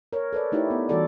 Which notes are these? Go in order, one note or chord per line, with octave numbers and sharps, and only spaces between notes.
A#4 C#5
A4 B4 D5
A3 D#4 E4 G4 C#5
B3
E3 G3 F4 F#4 A4 D5